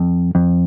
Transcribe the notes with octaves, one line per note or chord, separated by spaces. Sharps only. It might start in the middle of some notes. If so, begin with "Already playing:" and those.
Already playing: F2
F2